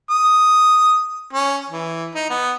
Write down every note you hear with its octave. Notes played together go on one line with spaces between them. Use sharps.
D#6
C#4
E3
D#4
B3